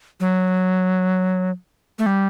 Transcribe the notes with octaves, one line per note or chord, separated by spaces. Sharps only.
F#3
A3
G3